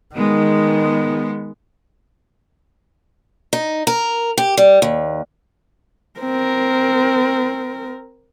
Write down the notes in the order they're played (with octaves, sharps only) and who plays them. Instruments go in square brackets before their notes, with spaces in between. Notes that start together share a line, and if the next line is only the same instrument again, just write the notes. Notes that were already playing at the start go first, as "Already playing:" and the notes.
[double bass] D#3 [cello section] G#3 B3
[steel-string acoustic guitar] D#4
A#4
G4
G3
D#2
[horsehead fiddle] C4 A#4